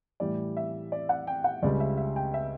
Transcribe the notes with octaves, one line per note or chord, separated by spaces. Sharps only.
A2 E3 G3 D5
E5
D5
F#5
G5
F#5
C#2 C#3 G3 D5
E5
E5
G5
E5